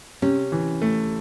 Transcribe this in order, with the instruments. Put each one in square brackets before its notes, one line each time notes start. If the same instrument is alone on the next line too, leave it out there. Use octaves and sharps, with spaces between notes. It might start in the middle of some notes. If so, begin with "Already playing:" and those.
[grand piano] C3 [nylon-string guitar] C#4
[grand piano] E3
A3